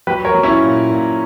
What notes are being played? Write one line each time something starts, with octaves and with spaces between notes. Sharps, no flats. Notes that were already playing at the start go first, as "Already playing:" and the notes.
F#3 G4 B4
A#4 C#5
F#3
C#4 E4
A#2
A#2